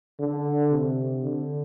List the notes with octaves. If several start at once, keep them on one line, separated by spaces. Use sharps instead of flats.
D3
C3
D3